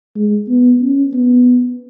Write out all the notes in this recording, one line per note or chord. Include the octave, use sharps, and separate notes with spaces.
G#3
B3
C#4
B3